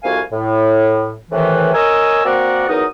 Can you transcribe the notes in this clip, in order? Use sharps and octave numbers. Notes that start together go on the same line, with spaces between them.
C2 F2 F#4 F5 G#5
A2
A2 C3 D#3 E3
A#4 C#5 D#5 G#5 E6
A#3 C4 F#4 A#4 D5 F#5
E2 F#3 D#4 A#4 D#6